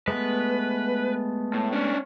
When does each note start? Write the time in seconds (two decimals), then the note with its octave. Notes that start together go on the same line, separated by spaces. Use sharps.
0.08 G#3 A3 B3 B4
1.54 A2
1.73 C#4 D4